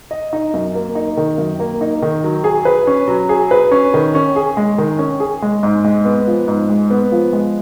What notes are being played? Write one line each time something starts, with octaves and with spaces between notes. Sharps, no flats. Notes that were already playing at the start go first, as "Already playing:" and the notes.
D#5
D#4
F#2
A#3
D#4
D#3
F#2
A#3
D#4
D#3
F#3
G#4
B4
C#4
F#3
G#4
B4
C#4
D#3
C#4
G#4
G#3
D#3
C#4
G#4
G#3
G#2
G#3
B3
F3
G#2
G#3
B3
F3
G#3